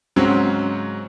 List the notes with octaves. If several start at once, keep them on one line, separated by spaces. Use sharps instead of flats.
G#2 C#3 F#3 C4 C#4